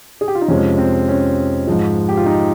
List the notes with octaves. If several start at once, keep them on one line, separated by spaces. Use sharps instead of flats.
G#4
G4
F4
D#4
F2 C3 F3 G#3 C#4
C4
C#4
G#2 F3 G#3
G4
F4
D#4